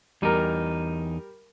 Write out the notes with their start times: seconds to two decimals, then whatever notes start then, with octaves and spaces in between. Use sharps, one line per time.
0.22 E2 G3 D#4 A#4